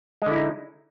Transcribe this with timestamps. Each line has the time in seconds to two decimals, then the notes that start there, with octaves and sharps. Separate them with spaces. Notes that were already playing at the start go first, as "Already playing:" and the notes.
0.22 G#3
0.26 D3
0.31 E4
0.36 D#4